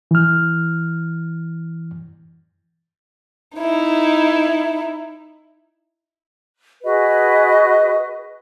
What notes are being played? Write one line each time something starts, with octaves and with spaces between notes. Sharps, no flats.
E3 F6
D#4 E4
F#4 G#4 B4 D#5